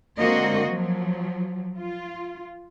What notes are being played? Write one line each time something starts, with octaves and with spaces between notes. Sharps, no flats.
D3 G#3 A#3 C4 F#4 D#5
F3 F#3
F4